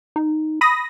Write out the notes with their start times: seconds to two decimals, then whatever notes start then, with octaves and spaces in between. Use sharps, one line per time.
0.16 D#4
0.61 B5 D#6 A#6